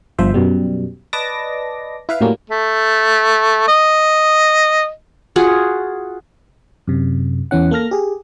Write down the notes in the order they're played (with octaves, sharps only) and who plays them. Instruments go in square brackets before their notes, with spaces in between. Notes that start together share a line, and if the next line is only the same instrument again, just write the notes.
[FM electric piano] G1 F3 C5 E5
F#2 B2 G3
B4 D5 D#5 A5 D6 A#6
E4 B4 F5
A2 F#3 G3 A#3 C#4
[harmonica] A3
D#5
[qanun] F4 F#4 G#4 F#5
[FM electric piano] F#2 C3
E2 E3 C#4 F#5
A#3 A4 F6 A#6
G4 G#4